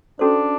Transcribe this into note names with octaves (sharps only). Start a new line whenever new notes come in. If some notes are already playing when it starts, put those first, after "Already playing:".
C#4 D4 F#4 A4 C5